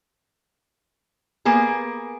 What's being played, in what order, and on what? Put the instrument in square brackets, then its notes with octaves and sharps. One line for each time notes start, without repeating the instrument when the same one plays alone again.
[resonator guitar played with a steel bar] A#3 B3 G#4